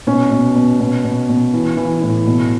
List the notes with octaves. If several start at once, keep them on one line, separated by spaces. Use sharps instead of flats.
B2 C#4
B2
B2
B2
B2
B2
E3
E3
A2
B2